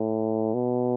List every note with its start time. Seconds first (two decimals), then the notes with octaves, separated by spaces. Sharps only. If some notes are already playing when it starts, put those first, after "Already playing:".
Already playing: A2
0.54 B2